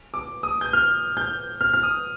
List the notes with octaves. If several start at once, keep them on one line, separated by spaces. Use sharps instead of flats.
D6
D#6
G6
F6
G6
F6
F6
D#6